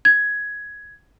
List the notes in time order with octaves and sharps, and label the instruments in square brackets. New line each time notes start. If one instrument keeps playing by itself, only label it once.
[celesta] G#6